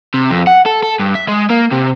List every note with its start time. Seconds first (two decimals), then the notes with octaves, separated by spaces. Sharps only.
0.14 C3
0.31 F2
0.47 F#5
0.66 A4
0.83 A4
0.99 G2
1.15 E5
1.28 G#3
1.50 A#3
1.72 C3